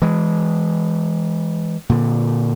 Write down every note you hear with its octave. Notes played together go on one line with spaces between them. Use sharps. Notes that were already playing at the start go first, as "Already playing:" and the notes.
E3 G#3
A#2 D3